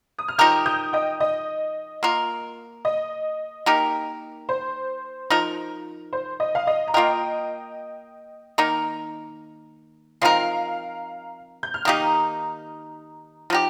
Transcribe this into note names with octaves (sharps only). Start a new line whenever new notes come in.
D#6
F6
F3 D#4 G4 A#4 D#6 G6
D#6 G6
D#5 G5
D#5
A#3 F4 A#4
D#5
A#3 D#4 G4 A#4
C5
F3 D#4 A#4
C5
D#5
F5
D#5
A#5
A#3 F4 A#4 D#5 G5
D#3 A#3 D#4 A#4
F3 C4 D#4 A#4 F5 A#5
G6
F6
D#3 A#3 D#4 G4 A#5 D#6
F3 D#4 G4